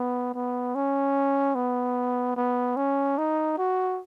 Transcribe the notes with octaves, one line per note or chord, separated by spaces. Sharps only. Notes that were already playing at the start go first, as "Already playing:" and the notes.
Already playing: B3
B3
C#4
B3
B3
C#4
D#4
F#4